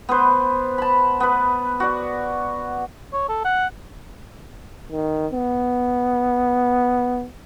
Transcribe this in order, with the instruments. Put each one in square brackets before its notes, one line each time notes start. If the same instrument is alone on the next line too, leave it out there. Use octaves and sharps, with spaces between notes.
[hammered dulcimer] B3 B4 C5
A5 B5
B3 B4
F#4 D5
[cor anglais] C#5
A4
F#5
[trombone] D#3
B3